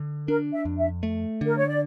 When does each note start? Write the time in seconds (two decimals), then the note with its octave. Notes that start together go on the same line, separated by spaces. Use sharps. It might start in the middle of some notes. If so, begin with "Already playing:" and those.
Already playing: D3
0.28 D4 A#4
0.53 E5
0.65 F2
0.78 E5
1.03 A3
1.41 D3 A#4
1.57 C#5
1.68 D5